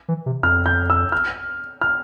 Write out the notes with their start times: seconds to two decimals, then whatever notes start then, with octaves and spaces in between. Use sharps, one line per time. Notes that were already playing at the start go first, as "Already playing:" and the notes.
0.08 E3
0.26 C3
0.43 F2 F6
0.66 G6
0.90 E6
1.12 F6
1.81 F6